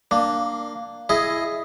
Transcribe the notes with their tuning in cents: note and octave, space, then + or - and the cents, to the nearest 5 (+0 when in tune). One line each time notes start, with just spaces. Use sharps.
A#3 +0 D4 +10
E4 +10 G#4 +10 D#5 +0